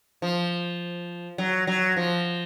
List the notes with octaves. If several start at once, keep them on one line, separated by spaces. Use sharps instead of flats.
F3
F#3
F#3
F3